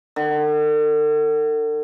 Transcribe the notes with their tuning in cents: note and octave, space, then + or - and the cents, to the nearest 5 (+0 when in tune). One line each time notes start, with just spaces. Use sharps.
D3 +45